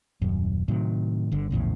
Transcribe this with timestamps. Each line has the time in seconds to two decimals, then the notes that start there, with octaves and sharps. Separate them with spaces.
0.21 D#1 F#2
0.68 A2 C3 D#3 F#3
1.32 G1 D3
1.51 A#1 E2 A2 C#3